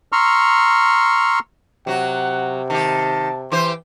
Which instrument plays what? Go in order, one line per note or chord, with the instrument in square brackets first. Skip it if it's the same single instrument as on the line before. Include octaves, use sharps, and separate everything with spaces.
[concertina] A#5 C6 C#6 E6 F6
[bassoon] C3 [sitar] F#3 F#4 [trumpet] F#5
[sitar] D#3 G4 [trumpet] A5
[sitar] E3 G4 C5 [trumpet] C6